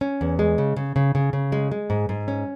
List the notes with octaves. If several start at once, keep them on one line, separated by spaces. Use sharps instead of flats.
C#4
E2
G#3
C#3
C#3
C#3
C#3
C#3
G#3
G#3
G#2
G#2
C#4